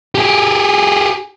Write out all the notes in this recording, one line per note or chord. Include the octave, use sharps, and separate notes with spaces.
G4 G#4